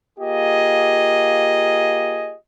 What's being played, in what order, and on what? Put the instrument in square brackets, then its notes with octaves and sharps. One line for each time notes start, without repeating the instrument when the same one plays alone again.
[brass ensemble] A#3 F4 G4 G#4 D#5